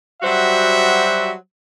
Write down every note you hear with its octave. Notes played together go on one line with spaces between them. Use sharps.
F#3 G3 F#4 C5 E5